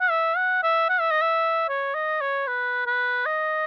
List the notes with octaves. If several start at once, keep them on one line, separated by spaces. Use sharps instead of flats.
F#5
E5
F#5
E5
F#5
E5
D#5
E5
C#5
D#5
C#5
B4
B4
D#5